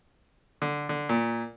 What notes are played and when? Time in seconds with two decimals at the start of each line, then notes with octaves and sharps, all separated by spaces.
0.62 D3
0.89 D3
1.09 A#2